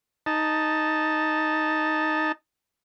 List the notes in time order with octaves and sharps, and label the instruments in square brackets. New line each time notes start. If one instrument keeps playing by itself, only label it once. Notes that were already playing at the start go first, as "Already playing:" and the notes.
[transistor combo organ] D#4 A5